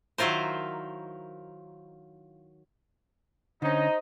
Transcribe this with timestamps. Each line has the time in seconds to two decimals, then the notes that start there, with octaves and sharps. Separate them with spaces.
0.18 D#3 F#3 E4 F4 A#4 C5
3.62 D3 C#4 D#4 C5 D#5